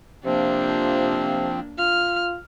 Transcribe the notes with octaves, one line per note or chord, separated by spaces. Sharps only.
C3 F3 A#3 C4 D4
F4 F6